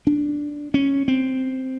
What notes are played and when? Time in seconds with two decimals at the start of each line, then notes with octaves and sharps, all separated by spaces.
0.07 D4
0.74 C#4
1.08 C4